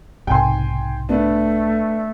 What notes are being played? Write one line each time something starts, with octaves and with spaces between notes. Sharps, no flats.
B1 G#2 C3 G5 G#5 C6
A3 B3 D4